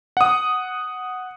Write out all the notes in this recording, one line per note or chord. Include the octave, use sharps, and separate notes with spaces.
F#5 D#6